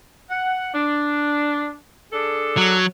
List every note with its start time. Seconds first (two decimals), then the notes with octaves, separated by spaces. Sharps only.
0.31 F#5
0.74 D4
2.13 D4 G#4 A4
2.57 F#3